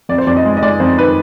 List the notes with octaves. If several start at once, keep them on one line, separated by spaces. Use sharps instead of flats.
F2 D5
C5
F2 D5
D#5
G#3
D#5
G#3 D5
F2 C5
D#3 B4